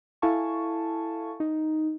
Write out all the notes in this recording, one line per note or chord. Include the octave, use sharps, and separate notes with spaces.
E4 A4 F5 G#5 A5 C#6
D#4